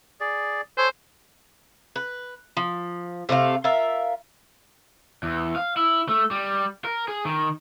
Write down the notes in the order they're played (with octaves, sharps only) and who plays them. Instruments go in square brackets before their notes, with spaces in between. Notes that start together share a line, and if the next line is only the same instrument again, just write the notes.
[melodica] G#4 D5
[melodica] A4 C#5 G#5 [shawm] C5
[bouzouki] B4
F3
C3 A3 B4 F5
F4 A#4 E5
[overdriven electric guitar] E2
F5
E4
A3
G3
A#4
G#4
D#3